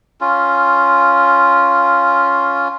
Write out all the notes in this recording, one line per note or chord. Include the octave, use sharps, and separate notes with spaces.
C#4 F4